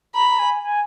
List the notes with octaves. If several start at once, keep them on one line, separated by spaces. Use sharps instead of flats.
A#5 B5
A#5
G#5
G#5